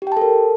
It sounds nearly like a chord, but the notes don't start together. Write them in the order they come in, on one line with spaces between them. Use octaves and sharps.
G4 G5 A5 A4 A#4